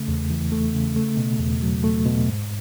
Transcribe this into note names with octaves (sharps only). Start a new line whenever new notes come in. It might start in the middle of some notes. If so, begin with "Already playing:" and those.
Already playing: C#3 A3
E2
E3
A3
C#3
A3
B2
E2
F#3
A3
B2
G#2